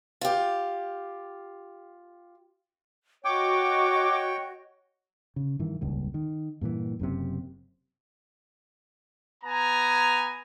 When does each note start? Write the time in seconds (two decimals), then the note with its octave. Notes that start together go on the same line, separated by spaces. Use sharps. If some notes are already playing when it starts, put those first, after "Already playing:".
0.21 F4 G4
3.24 F#4 C#5 D#5 G5 D6
5.36 C#3
5.59 G2 D#3 E3
5.81 D#1 C#2 G2
6.14 D#3
6.61 G2 A#2 C#3 E3
6.99 F#1 F#2 A2 C3
9.44 B3 G#5 A#5